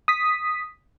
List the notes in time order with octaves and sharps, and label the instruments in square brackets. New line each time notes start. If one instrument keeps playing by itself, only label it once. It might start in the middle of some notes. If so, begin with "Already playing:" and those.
[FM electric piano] D#6 B6